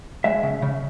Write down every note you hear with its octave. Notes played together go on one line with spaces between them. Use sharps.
G#3 E5
C#3
C#3